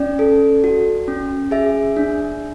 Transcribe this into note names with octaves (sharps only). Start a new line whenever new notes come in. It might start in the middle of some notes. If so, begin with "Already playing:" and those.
Already playing: C#4 D5
A4
F#4
C#4
G#4 E5
D4